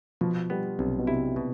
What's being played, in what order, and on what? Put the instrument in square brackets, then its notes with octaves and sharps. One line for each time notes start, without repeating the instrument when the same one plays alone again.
[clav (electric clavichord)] B2 [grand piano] F3
[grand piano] G3 [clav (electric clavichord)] B3
[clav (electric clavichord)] B1 [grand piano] C3
[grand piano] B2
[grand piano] C3 [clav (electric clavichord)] E4
[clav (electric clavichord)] B2